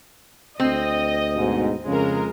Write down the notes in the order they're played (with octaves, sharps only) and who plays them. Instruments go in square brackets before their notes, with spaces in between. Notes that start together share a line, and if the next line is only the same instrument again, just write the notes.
[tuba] D2 [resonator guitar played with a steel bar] C4 [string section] D#5
[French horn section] G#2 B2
[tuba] F2 [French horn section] C#3 [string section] G#3 A#4